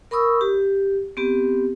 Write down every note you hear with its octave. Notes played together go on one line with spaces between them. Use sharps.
A#4 B5 C#6 D#6 E6
G4
B3 C4 G4